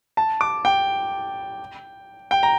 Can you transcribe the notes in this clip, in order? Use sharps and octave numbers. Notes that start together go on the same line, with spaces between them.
A5
D6
G5
G5
A#5